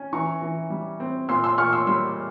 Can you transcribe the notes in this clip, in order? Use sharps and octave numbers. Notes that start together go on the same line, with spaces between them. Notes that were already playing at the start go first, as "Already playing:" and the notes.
Already playing: C#4
E3 A#5 C#6
E3
G3
C4
A#2 C6 E6
C6 E6
A#2 C#6 F6
C6 E6
G3 C6 E6